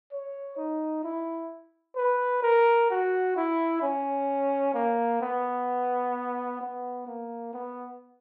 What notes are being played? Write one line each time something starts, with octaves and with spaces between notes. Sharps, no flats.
C#5
D#4
E4
B4
A#4
F#4
E4
C#4
A#3
B3
B3
A#3
B3